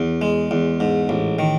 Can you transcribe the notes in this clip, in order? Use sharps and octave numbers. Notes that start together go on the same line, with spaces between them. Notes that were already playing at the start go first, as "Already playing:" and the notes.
Already playing: E2
G#3
E2
G#2
A1
D#3